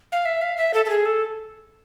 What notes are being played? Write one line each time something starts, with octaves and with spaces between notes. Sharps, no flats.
F5
E5
F5
E5
A4
A4
G#4
A4